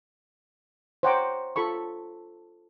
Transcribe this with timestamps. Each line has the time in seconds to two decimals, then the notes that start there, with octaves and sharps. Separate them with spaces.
1.03 C5 C#5 F#5 G5 A#5 D6
1.56 F4 A4 B5 C#6